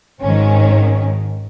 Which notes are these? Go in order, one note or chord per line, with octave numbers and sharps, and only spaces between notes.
G#1 G#2 D#3 C#4